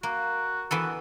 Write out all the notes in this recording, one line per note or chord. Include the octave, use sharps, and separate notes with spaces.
A#3 F#4
E3 B3 F#4 A4